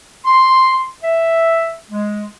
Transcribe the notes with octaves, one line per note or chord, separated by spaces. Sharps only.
C6
E5
G#3